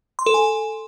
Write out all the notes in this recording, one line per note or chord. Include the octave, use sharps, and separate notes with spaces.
C6
A4
G#5